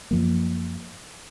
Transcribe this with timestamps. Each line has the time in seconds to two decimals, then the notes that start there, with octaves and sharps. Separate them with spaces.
0.11 F#2 F3 A#3